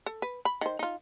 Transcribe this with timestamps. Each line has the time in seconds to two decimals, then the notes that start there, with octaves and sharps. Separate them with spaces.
0.06 A4
0.22 B4
0.45 B5
0.61 D#3 C5
0.79 D#4 F4